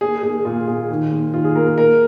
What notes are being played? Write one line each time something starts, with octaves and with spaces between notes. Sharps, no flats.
A#3 G#4
A#3 G#4
A#2 F4
A#2 G#4
D#2
A#3
D#2 F4
G#4
A#3 A#4
A#4
A#3 A#4